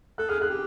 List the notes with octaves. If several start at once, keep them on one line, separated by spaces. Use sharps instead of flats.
A4 F#6
G#4 F6
G#4 F#6
G4